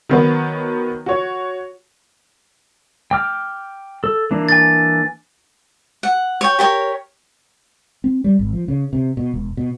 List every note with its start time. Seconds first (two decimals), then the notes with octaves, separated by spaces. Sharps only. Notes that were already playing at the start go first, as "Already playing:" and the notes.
0.09 D#3 F#3 B3 F#4 B4
1.06 F#4 C#5
3.11 G5 D6 F6
4.04 A4
4.31 E3 A#3 D4
4.49 G#5 A6
6.03 F#5
6.41 C#5 G5
6.59 G4 A#4 C#5
8.04 C4
8.24 G3
8.39 G#1
8.53 F3
8.68 C#3
8.93 C3
9.17 B2
9.34 E1
9.57 B2